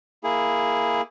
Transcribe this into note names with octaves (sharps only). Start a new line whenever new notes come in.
A#3 E4 G#4